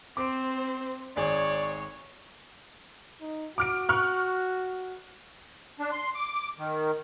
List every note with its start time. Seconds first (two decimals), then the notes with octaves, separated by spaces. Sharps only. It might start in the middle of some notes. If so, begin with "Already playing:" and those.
0.17 C4 C5 D6 D7
1.17 G#1 G#4 C#5 D5
3.21 D#4
3.58 F#4 D6 F6 D7
3.89 C#6 F6 F#6
5.79 D4
5.92 C6
6.15 D6
6.58 D#3